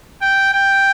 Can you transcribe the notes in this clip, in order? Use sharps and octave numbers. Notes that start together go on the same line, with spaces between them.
G5
G5